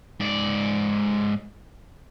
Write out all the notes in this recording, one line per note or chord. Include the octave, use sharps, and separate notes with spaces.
G#2 D5